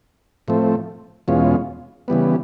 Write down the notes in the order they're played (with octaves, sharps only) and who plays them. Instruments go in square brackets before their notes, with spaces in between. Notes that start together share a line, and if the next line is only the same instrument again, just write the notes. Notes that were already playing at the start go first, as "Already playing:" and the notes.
[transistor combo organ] A2 F3 A3 C4
E2 B2 G#3 C#4 F4
C#3 E3 G3 B3